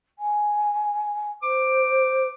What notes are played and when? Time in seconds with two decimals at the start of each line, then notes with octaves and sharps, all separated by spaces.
0.19 G#5
1.43 C5 D6